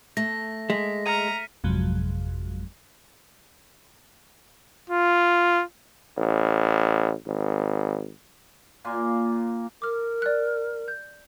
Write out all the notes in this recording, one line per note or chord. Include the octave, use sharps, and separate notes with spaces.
A3 A#6
G#3 B6
A#5 F6 C#7 D#7
G#1 F2 C3 F3 F#3 G#3
F4
A1
G#1
A#2 A#3 G#5 C6
A#4 D6 F6
D5 F#6
G6